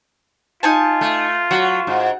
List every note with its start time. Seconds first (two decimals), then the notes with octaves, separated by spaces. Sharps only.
0.63 D#4 F4 G#5 A5
1.01 A3
1.51 F#3 F#4
1.87 G#2